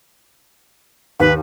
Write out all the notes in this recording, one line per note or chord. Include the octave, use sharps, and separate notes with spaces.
D#2 B4